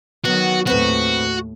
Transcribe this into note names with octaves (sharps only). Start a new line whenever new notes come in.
D#3 F#3 B3 F#4
D#2 A2 C4 F#4 B4